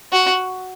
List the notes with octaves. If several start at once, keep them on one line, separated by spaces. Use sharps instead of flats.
F#4